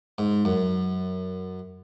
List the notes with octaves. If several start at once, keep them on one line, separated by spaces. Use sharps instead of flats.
G#2
F#2